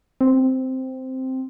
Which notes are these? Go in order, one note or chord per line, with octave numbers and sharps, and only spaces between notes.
C4